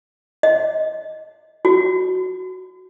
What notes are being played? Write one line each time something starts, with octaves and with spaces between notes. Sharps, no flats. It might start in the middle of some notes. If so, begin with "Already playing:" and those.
D#5
F#4